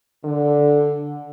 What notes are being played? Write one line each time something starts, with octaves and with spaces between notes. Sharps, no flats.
D3